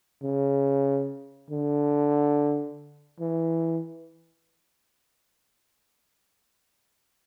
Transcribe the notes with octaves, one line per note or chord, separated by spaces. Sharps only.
C#3
D3
E3